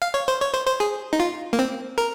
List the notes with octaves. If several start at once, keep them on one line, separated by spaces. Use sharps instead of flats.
F5
C#5
C5
C#5
C5
C5
G#4
D#4
F4
A#3
C4
A#4